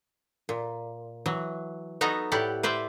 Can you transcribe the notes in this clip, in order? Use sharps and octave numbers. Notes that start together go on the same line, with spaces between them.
A#2
E3 F#3
B3 D#4 F#4 A4 A#5
A2 E4 G4 D5 F#5
B4 C5 D5 E5